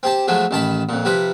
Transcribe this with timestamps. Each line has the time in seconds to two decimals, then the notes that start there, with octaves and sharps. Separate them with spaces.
0.03 C4 G4 A5
0.28 F3 F#3 G#3 A3
0.51 A1 D#3 A5 B5
0.89 F2 A#2
1.05 C3 F3 B4